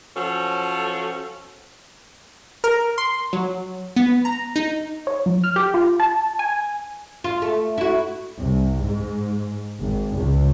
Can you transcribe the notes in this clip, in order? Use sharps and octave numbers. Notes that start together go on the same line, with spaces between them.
F3 F#3 C#4 F#4 A4
A#4
C6
F#3
B3
A#5
D#4
C#5
F#3
F6
G4
F4
A5
G#5
F4
A3
E4 F#4
C2
G#2
G#1
C#2